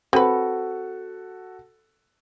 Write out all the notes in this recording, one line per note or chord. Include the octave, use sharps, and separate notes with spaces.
C4 F#4 A4 B4